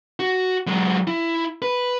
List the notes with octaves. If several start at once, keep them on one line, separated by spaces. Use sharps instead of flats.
F#4
F#3 G#3
E4
B4